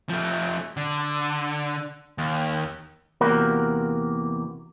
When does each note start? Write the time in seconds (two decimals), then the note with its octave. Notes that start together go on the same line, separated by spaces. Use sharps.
0.09 F3 A3
0.77 D3
2.18 D#2
3.21 E2 C3 A#3 F#4 A#4